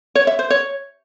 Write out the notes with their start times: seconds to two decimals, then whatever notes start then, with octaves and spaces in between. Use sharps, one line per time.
0.15 C#5
0.27 E5
0.39 C5
0.50 C#5